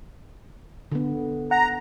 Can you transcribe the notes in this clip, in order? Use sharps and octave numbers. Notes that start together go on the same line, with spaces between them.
D3 B3
F#5 A#5